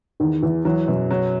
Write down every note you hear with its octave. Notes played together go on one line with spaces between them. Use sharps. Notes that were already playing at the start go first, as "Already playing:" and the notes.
E2 D#3
E2 E3
E3 F#3
F#2 B2
F#3